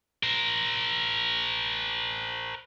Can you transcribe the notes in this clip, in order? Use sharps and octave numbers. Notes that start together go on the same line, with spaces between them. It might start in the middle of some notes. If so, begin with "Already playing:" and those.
A#4 C5